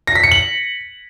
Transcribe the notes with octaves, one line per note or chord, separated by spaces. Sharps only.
A#6
B6
C#7
F#7